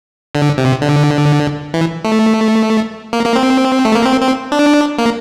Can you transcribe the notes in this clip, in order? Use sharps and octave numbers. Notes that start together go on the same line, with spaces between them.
D3
C3
D3
E3
A3
A#3
A#3
C4
A3
A#3
C4
C4
D4
A#3